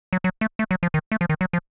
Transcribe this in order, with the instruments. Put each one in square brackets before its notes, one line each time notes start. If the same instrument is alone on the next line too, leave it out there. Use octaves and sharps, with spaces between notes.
[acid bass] F#3
F#3
A3
A3
F#3
F3
D#3
A3
F3
D#3
F#3
F3